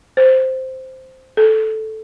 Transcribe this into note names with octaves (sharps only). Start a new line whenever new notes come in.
C5
A4